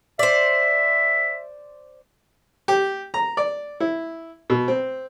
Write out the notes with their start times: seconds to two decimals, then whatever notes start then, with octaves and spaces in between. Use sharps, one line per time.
0.19 C5 D5 E5
2.68 G4
3.14 A#5
3.37 D5
3.80 E4
4.50 B2
4.68 C4